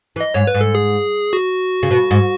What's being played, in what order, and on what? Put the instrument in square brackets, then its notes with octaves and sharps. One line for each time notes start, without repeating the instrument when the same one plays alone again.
[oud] E3
[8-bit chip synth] D#5
[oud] G#2 [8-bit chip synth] C#5
[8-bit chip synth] B4
[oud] G#2
[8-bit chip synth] A4
G#4
F#4
[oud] C#3
B2
G#2